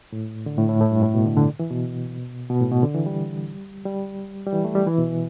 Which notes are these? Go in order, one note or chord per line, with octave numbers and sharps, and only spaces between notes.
A2
D3
A2
A2
A2
G2
A2
B2
D3
D3
E3
B2
B2
A2
B2
D3
E3
G3
G3
G3
E3
A3
G3
E3
B2